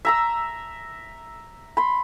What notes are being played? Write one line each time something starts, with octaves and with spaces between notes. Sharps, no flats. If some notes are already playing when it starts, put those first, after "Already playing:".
E5 A#5 E6
B5 C6